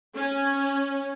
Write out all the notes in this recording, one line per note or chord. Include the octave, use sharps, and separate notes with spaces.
C#4